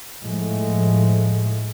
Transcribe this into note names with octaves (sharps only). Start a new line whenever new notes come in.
A2 F3 G#3 A3